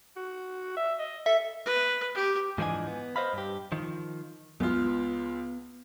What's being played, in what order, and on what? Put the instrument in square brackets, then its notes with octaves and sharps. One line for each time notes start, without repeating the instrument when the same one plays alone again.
[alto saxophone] F#4
E5
D#5
[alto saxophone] A4 [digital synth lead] E5
[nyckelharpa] B4
G4
[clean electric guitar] G#2 E3 F3 D4 D#5 G#5
B3
B4 C5 D#5 F5 B5
G2 G4
D#3 F3
[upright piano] C#2 F4 [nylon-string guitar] B3